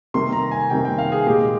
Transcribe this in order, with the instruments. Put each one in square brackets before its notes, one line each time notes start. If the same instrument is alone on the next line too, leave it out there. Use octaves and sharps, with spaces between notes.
[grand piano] C3 D#3 G3 A#3 C6
A#5
G#5
C3 D#3 G3 A#3 G5
G5
F5
G#4
A#2 G#3 G4